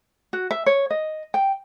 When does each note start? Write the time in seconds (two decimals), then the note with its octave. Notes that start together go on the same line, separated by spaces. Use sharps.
0.33 F#4
0.51 E5
0.66 C#5
0.91 D#5
1.34 G5